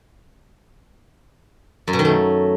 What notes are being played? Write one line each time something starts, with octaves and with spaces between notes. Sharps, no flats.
F#2
B2
D#3
A3